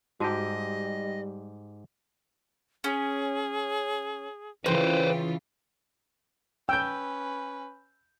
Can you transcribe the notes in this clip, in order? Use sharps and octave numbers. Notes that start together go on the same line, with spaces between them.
G#2 G3 F#4 G4 D#5 A5
C#4 G#4
C#3 E3 C4 F4 B4 C5 G5
C#4 B4 G5 E6 G6